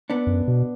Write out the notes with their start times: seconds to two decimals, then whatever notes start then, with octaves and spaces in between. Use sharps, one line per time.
0.10 B3 D4
0.27 F#2
0.48 B2